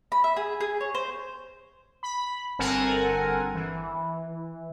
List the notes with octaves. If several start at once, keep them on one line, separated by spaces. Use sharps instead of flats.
B5
E5
G#4
G#4
C#5
C5
B5
G1 C4 A4 A#4 F#5 G#5
E3